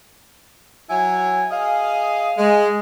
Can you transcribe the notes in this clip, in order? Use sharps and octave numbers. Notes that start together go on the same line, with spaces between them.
F#3 E4 G#5
G#4 D#5 F5
G#3